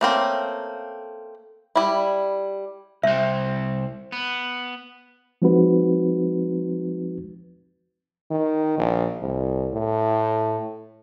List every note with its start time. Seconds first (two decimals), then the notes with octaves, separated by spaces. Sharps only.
0.01 A3 A#3 C4 C#4
1.76 G3 E4
3.03 C2 C4 E5
4.12 B3
5.42 F3 G#3 C4 D#4 F#4 B4
8.31 D#3
8.78 A#1
9.21 C2
9.74 A2